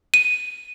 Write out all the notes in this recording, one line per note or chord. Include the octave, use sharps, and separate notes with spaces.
D#7